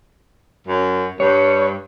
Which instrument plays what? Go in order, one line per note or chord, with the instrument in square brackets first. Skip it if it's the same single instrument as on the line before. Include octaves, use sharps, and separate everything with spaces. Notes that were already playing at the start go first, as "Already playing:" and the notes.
[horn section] F#2
[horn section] G2 [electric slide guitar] C#5